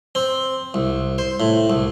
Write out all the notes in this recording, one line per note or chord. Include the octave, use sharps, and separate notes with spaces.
C4
C2
C5
A2
C2